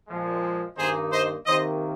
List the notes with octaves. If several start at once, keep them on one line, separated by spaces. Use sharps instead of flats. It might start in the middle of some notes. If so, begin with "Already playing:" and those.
A#2 F3 G#3
G2 D#3 A#3 D#4 G#4 C5
C5 D#5
C3 D#3 A#3 C5 D#5